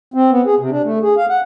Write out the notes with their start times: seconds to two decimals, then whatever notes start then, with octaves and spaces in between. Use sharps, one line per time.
0.14 C4
0.31 B3
0.46 G#4
0.59 C3
0.71 D4
0.84 A3
1.02 G#4
1.17 F5
1.30 F#5